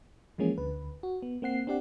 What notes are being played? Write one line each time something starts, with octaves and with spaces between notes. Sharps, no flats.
E3 F3 G#3 A#3 C#4 G#4
D2 D3 B4
F#4
B3
A#3 C4 F#5 C7
C4 D4 G4 D5 F#5